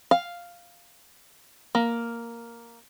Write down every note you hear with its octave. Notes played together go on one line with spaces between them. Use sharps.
F5
A#3